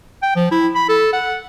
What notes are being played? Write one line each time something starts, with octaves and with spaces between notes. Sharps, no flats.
G5
F3
E4
B5
A4
F#5